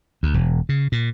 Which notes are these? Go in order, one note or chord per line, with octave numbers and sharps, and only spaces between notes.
D2
E1
C#3
A#2